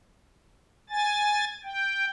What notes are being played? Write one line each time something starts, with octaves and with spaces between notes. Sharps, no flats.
G#5 A6
G5